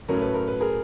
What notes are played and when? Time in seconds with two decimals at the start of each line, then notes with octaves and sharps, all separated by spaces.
0.08 A2 F#3 A3 C#4 A#4
0.21 B4
0.34 A#4
0.47 B4
0.60 G#4 A#4